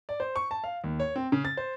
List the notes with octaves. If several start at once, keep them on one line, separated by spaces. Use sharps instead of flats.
D5
C5
C#6
A5
F5
D#2
C#5
C4
C#3
A6
C5